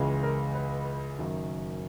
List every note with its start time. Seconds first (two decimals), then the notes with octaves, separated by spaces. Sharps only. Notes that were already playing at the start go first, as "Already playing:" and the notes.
Already playing: C#2 C#3 E3 G#3
0.23 A#4
0.55 B4
1.18 F#1 F#2 D#3